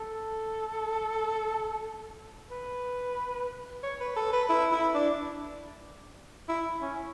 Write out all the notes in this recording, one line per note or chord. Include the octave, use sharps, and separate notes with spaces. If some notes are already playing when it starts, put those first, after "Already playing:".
Already playing: A4
B4
C#5
B4
A4
B4
E4
E4
D4
E4
C#4